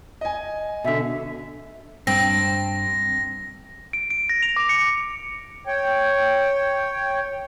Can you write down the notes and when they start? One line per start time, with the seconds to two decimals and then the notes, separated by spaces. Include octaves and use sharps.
0.21 D#5 G#5
0.84 B2 D3 E5
2.07 G2 C4 A#6
3.93 D7
4.10 D7
4.29 A#6
4.43 F7
4.56 D6
4.69 C#7
5.67 C#5 G5